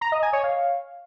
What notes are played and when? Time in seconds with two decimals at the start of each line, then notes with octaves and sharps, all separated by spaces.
0.01 A#5
0.12 D#5
0.22 G#5
0.33 C#5
0.43 F5